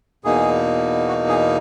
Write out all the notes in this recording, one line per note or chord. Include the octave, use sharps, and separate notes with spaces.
E2 B2 A#3 D#4 G#4
F#4
G#4